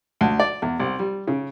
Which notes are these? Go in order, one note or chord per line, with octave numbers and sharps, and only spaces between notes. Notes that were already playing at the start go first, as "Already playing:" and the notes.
D2
D5
E2
C2
G3
C#3